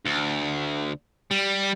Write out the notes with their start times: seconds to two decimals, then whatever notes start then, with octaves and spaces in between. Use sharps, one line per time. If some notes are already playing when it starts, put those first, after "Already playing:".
0.06 D2
1.31 G3